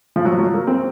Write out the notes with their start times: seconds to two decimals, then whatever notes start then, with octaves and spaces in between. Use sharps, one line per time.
0.16 F3
0.25 F#3
0.39 F#3
0.54 A#3
0.67 C4